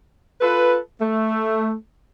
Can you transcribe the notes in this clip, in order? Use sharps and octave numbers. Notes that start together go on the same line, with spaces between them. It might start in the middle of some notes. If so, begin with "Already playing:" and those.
F4 A4 B4
A3